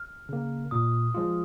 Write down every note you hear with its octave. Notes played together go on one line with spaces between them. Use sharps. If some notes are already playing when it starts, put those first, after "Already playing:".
Already playing: F6
C#3 A#3
A#2 D#6
F3 G#3 F4